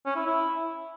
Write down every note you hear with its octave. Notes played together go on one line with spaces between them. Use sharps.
C#4
E4
E4